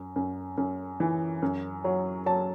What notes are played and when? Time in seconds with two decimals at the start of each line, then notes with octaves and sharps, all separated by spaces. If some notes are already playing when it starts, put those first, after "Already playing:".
Already playing: F#2
0.16 F#2
0.58 F#2
1.00 E3
1.42 F#2
1.84 F#3
2.26 F#3 A5